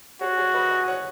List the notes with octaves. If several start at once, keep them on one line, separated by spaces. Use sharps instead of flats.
F#4 G#4 C#5
G#4 C#5
B4 D#5
D#5 G#5
G#5
C#5 F#5